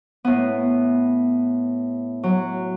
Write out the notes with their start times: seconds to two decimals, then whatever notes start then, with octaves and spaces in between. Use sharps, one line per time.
0.24 A2 B3
2.23 F#3